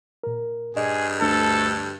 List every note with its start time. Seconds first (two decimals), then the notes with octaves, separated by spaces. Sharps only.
0.24 A#2 A#4
0.77 G2 G#4 D5 D#5
1.21 D2 A4